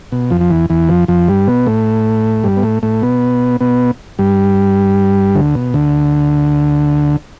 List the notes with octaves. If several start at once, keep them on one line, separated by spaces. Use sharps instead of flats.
B2
F2 F3
F3
E2 E3
E2 E3
F2 F3
F2 F3
G2 G3
B2 B3
A2 A3
G2 G3
B3
A2 A3
A2 A3
B2 B3
B2 B3
G2 G3
D2 D3
B2
D2 D3